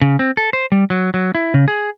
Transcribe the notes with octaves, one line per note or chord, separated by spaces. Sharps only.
C#3
C4
A4
C5
G3
F#3
F#3
E4
C#3
G#4